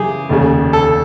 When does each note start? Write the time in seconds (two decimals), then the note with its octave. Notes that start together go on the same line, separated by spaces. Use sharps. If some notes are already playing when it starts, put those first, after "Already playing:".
Already playing: F#2 C#3 E3 G4 G#4
0.29 F1 D#2 C#3
0.73 A4